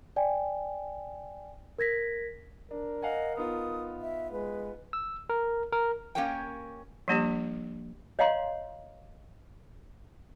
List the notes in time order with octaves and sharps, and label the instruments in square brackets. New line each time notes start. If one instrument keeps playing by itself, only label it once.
[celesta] D5 G5 G#5
A#4 G#6 A#6 B6
[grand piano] D4 [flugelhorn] A#4
[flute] D#5 [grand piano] F5 F#5 G#5
[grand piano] B3 D#4 F4 [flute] D#6
[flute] E5
[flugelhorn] G#3 [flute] B4
[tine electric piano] E6
A#4
A#4
[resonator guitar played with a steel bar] A#3 C#4 G4 A#4 C#5 G5
[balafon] F3 G3 A#3 D4 G4
[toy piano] C#5 D#5 F5 F#5 A#5 C6